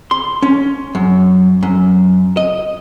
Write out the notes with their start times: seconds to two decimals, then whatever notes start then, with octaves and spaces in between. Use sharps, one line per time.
0.11 C6
0.42 C#4
0.95 F#2
1.63 F#2
2.37 D#5